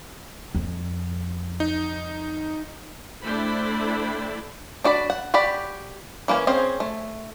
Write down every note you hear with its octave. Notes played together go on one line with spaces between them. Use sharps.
F2
D#4
A3 D4 E4 C5 G5 B5
D4 F#4 D5 B5
F#5
F#4 G4 D5 B5
E3 A#3 B3 C#4
C4 C#4 G#4 C5
A3